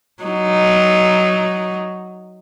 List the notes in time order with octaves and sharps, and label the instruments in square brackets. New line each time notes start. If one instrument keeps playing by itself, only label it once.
[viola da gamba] F#3 D#4